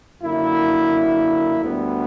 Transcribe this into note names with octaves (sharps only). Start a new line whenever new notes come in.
F#2 D3 A#3 E4
D2 D3 G3 B3